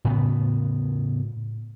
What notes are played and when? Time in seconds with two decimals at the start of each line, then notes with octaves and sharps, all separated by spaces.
0.05 A2 C#3 B3